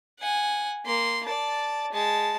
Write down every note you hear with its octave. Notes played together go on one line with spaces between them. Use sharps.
F#5 G#5
A#3 C6
D5 A5
G#3 A5